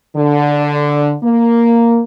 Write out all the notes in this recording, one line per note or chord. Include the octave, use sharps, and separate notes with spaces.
D3
A#3